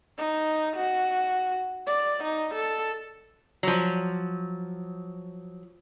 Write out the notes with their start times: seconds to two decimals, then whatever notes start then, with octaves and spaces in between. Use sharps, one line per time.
0.18 D#4
0.77 F#4
1.87 D5
2.23 D#4
2.54 A4
3.63 F3 F#3